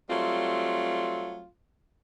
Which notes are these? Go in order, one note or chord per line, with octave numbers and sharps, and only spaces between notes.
F#3 G3 A3 C4 F4